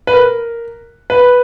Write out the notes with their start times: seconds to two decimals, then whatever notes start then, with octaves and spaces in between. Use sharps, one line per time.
0.07 B4
0.13 A#4
1.10 B4